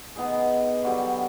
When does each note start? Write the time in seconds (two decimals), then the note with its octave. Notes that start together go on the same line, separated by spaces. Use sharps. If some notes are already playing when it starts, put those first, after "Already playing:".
0.16 B3 D#4 G#4
0.83 D3 F#3 G3 G4